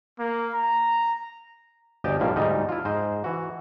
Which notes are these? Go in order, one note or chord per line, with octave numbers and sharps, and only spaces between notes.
A#3
A#5
G1 D2 G4 D#5 G5 A5
B1 A2 F3 G3 A#3 E5
D2 G#2 G3 D#4 D#5
E4 F4
G#2 C5 D#5
E3 F#4